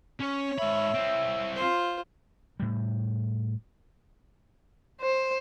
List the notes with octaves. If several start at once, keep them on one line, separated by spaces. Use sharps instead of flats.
C#4 C#5
G#2 E5 B5
C4 E4
F4 C5
A2 G3
C5